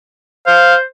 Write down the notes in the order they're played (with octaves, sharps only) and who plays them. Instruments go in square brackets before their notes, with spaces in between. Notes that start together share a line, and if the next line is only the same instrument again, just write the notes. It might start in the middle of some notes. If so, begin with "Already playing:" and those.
[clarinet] C5 [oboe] F5